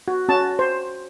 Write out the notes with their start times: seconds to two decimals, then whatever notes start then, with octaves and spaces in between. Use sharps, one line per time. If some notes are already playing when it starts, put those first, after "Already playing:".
0.08 F#4
0.29 C#4 F#4 A5
0.59 C5